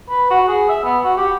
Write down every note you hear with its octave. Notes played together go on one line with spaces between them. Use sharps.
B4
F#4
G#4
E5
B3
F#4
G4